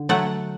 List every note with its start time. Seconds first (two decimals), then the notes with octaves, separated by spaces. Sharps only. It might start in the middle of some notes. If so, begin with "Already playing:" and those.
Already playing: D3
0.09 F#3 A3 F#5